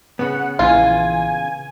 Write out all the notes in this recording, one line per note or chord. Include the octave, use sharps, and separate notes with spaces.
C#3 B3 F#5
A#1 E3 F4 G#5